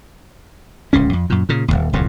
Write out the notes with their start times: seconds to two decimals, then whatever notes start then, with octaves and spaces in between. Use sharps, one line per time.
0.93 D1 C#2 C#3 C#4
1.13 F2
1.30 F#2 A#2
1.49 A#2 C#3
1.68 D#1 G#1 D#2
1.93 D1 C2 F2 A2